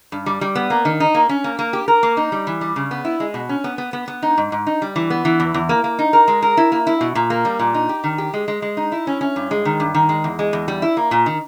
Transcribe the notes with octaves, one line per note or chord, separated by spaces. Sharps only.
G2
G3
G3
B3
A#3
D#3
D#4
A#3
C#4
A#3
A#3
G4
A#4
A#3
D#4
G3
E3
G3
C#3
B3
E4
G#3
B2
C#4
B3
B3
B3
B3
D#4
G#2
G#2
D#4
G3
E3
B3
E3
E2
E2
A#3
A#3
D#4
A#4
G#3
A#4
E4
A#3
E4
B2
A#2
A#3
G3
A#2
D#4
G4
D#3
G4
G#3
G#3
G#3
D#4
E4
C#4
C#4
G2
G#3
D#3
G2
D#3
G#3
E2
G#3
E2
G3
E4
A#3
A#2
D#3